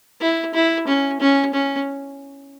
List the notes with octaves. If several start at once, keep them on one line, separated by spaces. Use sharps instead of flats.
E4
E4
C#4
C#4
C#4